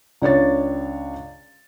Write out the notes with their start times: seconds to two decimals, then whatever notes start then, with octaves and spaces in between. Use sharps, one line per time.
0.22 C#2 D4 C#5 A6